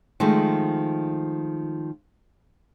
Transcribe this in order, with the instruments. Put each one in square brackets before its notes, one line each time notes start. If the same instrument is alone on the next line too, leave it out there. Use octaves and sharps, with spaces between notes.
[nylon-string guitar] D#3 F3 G#3 A3